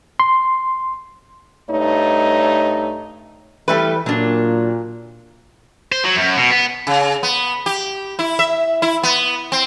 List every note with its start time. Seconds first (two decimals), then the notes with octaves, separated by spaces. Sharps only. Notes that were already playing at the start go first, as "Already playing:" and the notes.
0.20 C6
1.70 G2 A3 D#4 C#5
3.68 E3 G3 A3 B4
4.06 A#2 F#3 D4
5.92 C5
6.04 F#3
6.16 F#2
6.36 B2
6.50 B3
6.87 C#3
7.23 B3
7.66 G4
8.19 E4
8.39 E5
8.82 E4
9.03 B3
9.52 C4